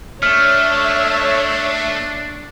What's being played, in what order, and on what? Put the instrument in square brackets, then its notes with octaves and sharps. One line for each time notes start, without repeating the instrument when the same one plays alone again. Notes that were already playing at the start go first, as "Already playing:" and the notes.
[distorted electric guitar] A3 [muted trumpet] D4 [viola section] C#5 E5 [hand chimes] F6